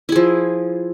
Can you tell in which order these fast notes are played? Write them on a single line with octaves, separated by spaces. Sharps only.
E4 G#4 F3